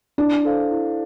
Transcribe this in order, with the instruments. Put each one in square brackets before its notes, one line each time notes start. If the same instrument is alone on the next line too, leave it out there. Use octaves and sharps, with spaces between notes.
[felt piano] D4 [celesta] E4
[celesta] A4 C5 F5
E4